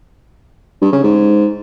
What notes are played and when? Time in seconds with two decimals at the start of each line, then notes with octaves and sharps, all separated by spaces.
0.81 G2
0.92 C#3
1.03 G#2